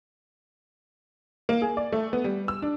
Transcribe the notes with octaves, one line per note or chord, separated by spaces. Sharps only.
A#3
G#4
D5
A3
B3
G3
E6
D4